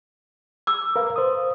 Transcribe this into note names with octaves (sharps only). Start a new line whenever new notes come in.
D6 E6
A#4 B4 F5
C5 D#6